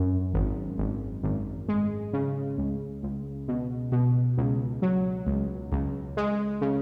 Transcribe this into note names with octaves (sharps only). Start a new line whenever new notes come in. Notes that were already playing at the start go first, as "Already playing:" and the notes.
Already playing: F#2
G#1
G#1
G#1
G#3
C#3
C#2
C#2
B2
B2
C#2
F#3
C#2
C#2
G#3
C#3